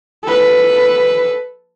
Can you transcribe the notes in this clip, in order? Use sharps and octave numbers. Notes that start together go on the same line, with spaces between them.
A4 B4